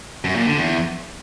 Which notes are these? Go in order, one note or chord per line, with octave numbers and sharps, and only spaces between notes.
F#2
A#2
D3
E2